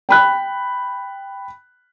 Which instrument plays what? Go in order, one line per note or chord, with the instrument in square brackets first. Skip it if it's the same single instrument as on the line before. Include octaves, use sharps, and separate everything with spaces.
[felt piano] G5 B5 F#6